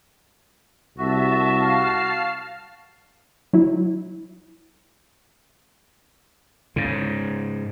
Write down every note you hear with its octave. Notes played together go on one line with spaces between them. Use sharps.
C2 F#4 E5 A5
F5 A5 C7
F#3 E4
G#2 C#3